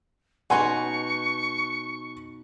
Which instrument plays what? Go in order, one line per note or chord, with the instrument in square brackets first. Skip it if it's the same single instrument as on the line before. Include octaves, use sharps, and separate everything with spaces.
[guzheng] B2 D#4 F#4 [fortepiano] F#5 G#5 C6 [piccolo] C#6